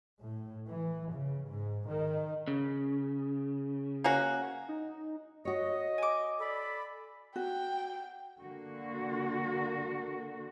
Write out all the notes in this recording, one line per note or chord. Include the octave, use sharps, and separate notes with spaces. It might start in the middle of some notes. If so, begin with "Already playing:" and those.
A2
E3
C#3
G#2
D#3
C#3
A#3 C#4 F#4
D#4
F#4 C#5 D#5
G#5 D6
A4 D5 B5
F#4 G5
D3 A#3 F#4